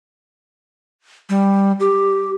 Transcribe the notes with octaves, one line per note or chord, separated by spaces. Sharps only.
G3
G4